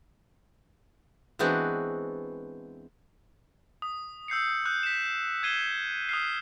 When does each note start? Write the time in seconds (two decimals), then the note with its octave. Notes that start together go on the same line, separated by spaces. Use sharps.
1.39 E3 G#3 B3 C4 D4 F#4
3.82 D#6
4.28 E6 G6 C7 C#7
4.66 D#6 F#6 G6
4.83 B6 E7
5.43 D#6 G#6 C7 D#7 E7 G7
6.09 D#6 F6 C7